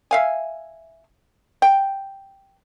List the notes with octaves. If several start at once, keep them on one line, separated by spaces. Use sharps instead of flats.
E5 F5 G#5
G5